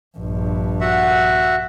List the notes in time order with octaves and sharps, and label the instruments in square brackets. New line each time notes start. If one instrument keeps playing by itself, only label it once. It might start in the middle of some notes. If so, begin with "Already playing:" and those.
[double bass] A#1 G2
[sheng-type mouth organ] F#4 E5 F#5